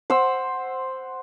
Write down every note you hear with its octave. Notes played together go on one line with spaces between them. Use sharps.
C5 F#5 E6